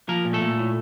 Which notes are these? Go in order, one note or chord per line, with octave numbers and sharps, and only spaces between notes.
F3 A#3 A#4
A#2
A3 A4
A#2
A2